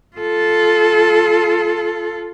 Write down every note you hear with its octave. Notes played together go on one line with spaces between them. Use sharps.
F4 A4